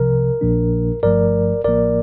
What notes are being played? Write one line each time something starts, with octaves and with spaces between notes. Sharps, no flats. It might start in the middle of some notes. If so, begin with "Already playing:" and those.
Already playing: C2 C3 F3 A#4
A#1 A#2 F3 A#3 D4
G1 G2 F3 A3 A#4 D5
A1 A2 F3 A#3 A#4 D5